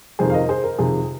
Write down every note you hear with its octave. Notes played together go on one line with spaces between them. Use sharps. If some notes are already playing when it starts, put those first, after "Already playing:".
F2 C3 D#3 G#4 C5
F5
A#4 D#5
G#4 C5
A#4
F2 C3 D#3 G#4